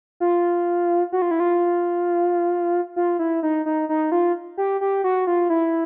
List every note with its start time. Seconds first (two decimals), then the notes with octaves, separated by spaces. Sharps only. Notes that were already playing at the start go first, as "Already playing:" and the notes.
0.20 F4
1.12 F#4
1.22 F4
1.31 E4
1.40 F4
2.96 F4
3.19 E4
3.43 D#4
3.66 D#4
3.89 D#4
4.12 F4
4.57 G4
4.81 G4
5.04 F#4
5.27 F4
5.50 E4